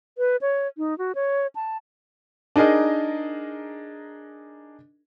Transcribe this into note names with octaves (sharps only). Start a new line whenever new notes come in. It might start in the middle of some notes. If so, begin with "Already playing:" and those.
B4
C#5
D#4
F#4
C#5
A5
D4 D#4 G#4 A#4 D#5